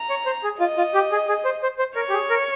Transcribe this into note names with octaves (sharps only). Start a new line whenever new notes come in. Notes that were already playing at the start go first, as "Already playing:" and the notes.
Already playing: A#5
C#5
C5
G#4
F4 D#5
F4
G4
G#4
G#4
C5
C5
C5
A#4 C#5
G4
G#4
A#4